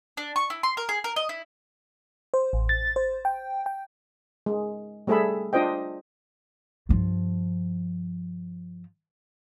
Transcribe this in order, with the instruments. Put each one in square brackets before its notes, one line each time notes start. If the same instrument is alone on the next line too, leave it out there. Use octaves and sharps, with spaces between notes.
[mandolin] D4
C#6
E4
C6
A#4
G#4
A#4
D#5
E4
[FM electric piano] C5
A1
A6
C5
G5
G5
[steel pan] G#3
G3 A3 G#4 A4 E5 B5
D4 F4 C5 D#5 G5
[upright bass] G2 F3